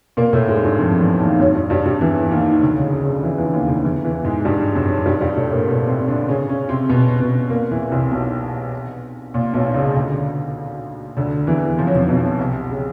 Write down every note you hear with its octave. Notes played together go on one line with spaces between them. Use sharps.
A#2 A#3
A2 A3
G#2 G#3
G2 G3
F2 F3
E2 E3
D#2 D#3
F#2 F#3
G2 G3
G2 G3
G2 G3
E2 E3
D#2 D#3
D#3
D2 D3
C#2 C#3
C#2 C#3
D2 D3
E2 E3
E2 E3
D3
D#2 D#3
D2 D3
E2 E3
E2 E3
G#2 G#3
G2 G3
F#2 F#3
G2 G3
G2 G3
A2 A3
A#2 A#3
B2 B3
C3 C4
D3 D4
C#3 C#4
C#3 C#4
C3 C4
B2 B3
B2 B3
A#2 A#3
E2 E3
C2 C3
B1 B2
A#2
B1 B2
C#2 C#3
D2 D3
D2 D3
E2 E3
F3
F#3
F2 F3
B1 B2
C2 C3
C#3